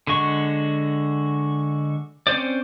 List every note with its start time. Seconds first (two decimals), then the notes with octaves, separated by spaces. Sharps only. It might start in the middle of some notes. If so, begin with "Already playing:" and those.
0.07 D3 G#3 F#4 C#6
2.27 C4 C#4 C5 D5